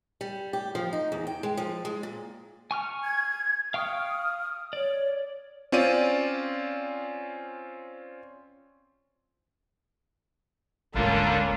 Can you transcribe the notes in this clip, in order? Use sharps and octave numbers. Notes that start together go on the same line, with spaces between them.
G3
G4
F3
D#4
E2
G5
G#3
F3
G#3
A#2
G#5 C#6 F6
G#6
F5 G5 C#6 D#6 F6
C#5 D5
C4 C#4 F4 D5 D#7
D1 G#1 D3 G3 A#3 C#4 D4 F4